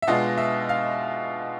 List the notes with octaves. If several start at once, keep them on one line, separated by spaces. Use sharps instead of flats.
E5
B2 G#3 B3 D4 F4 D#5
E5
F5